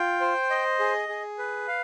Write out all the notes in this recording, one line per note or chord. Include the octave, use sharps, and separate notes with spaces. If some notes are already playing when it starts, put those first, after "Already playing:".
Already playing: F4 G5
C5
D#5
G#4
G#4
B4
F5